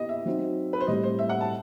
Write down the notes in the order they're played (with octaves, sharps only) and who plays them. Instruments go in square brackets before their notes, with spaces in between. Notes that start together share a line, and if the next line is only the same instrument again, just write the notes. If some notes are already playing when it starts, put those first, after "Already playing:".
Already playing: [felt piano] B3 E4 [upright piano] G4 D#5
[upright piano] E5
[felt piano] F#3 C4 D#4 F#4
[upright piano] B4
C5
[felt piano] A2 G3 C4 [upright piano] D#5
[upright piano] C5
E5
F#5
A5